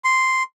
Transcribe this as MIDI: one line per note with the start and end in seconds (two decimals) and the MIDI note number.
0.04 0.43 84